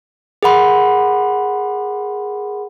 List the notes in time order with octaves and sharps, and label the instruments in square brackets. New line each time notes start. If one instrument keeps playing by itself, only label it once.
[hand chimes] G#4 A#4 F#5 B5 C6